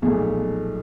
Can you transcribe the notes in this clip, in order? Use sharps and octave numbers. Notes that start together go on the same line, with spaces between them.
B1 A#2 F3 A3 G#4